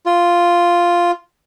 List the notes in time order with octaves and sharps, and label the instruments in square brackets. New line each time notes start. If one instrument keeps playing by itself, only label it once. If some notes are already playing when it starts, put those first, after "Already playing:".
[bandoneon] F4